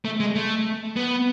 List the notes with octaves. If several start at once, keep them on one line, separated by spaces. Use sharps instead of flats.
A3
G#3
A3
B3